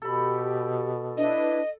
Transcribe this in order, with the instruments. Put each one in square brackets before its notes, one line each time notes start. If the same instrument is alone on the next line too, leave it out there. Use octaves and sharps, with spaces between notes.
[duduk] B2 [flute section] G4 [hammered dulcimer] A4 B5
[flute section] D4 E4 B4 [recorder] D#5